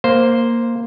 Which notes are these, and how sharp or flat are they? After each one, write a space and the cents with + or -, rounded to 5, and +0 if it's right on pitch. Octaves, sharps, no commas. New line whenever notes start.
A#3 +0 C5 +0